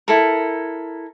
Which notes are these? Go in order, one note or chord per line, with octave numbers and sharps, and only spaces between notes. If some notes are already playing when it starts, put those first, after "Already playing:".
E4 A4 A#4